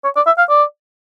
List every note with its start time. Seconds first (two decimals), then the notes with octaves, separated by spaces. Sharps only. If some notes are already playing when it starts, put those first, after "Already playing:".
0.04 C#5
0.16 D5
0.26 E5
0.38 F5
0.49 D5